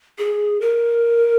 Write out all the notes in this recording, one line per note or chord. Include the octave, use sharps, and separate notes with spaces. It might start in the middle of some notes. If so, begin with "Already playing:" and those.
G#4
A#4